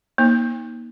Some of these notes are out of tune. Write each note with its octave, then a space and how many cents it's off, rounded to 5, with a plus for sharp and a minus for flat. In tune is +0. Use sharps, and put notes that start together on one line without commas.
A#3 +30 D#4 +20